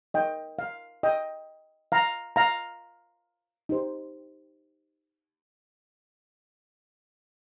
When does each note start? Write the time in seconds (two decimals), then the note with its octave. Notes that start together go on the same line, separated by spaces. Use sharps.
0.14 D#4 A#4 D#5 G5
0.59 F5
1.03 D#5 G5
1.92 F5 A#5
2.36 F5 A#5
3.69 D#4 G4 C5